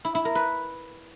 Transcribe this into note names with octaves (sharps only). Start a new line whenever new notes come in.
E4
E4
A#4
B4